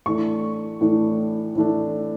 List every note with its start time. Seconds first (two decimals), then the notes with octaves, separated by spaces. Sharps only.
0.06 A2 E3 A3 D4 C#6
0.81 A2 E3 A3 D4
1.55 A2 E3 A3 D4